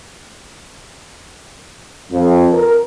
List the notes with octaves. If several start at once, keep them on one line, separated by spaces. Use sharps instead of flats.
F2
A#4